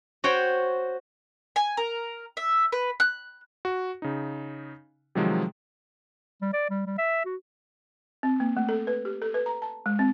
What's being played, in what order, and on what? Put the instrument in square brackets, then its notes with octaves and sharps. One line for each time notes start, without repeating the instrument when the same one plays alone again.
[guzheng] F#4 C5 C#5 G5
[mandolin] G#5
A#4
E5
B4
F#6
[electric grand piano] F#4
C#3 D#4
C3 D#3 F3 F#3 G#3
[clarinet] G3
D5
G3
G3
E5
F#4
[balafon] C4
A#3
A3
A4
B4
G4
A4
B4
A#5
A5
G#3
C4